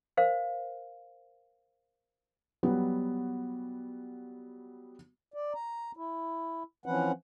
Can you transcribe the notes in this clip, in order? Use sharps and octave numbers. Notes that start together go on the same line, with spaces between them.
A#4 C5 F5
F#3 G3 B3 F#4
D5
A#5
E4
E3 F3 C4 C#4 B4 F#5